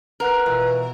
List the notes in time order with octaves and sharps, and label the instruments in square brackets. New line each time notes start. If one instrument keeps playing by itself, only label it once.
[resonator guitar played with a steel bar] A#4 [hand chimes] B4 F#5 F#6
[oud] B2 E3 F4